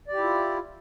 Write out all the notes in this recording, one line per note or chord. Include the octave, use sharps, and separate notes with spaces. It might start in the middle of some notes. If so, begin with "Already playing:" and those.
E4 F4 G4 D5